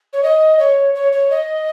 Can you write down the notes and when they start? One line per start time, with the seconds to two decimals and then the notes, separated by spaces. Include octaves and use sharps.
0.13 C#5
0.23 D#5
0.59 C#5
0.94 C#5
1.12 C#5
1.30 D#5